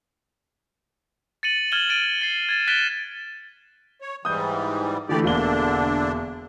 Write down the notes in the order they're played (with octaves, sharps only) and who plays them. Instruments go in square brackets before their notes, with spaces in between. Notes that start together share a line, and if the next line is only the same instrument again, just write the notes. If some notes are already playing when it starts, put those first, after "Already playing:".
[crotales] A6 C#7 D#7 F#7
F6 G#6 D#7 E7 F#7 G7
A6 D7 D#7
A6 C7
G#6 A6 E7
F#6 A6 B6 D7 E7 G7
[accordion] C#5
[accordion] G#2 E3 G3 [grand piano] D#6 G6
[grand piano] D3 E3 A3 [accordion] G4 D5
[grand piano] E1 A#3 G7 [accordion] D3 D4